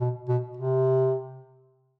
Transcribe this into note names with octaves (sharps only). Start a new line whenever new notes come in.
B2
B2
C3